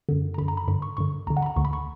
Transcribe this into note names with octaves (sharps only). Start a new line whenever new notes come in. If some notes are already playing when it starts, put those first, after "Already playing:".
F#2 D3
A#5
F#2 D3 B5
A#5
B5
G2 D3 B5
C#6
G2 D3 C#6
D2 D3 A#5
F#5
B5
A#5
D2 D3 C#6
B5
C#6